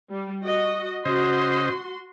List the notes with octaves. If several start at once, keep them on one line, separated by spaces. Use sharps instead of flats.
G3
F#4 D#5
C#3 F#4 C5 D#5 C6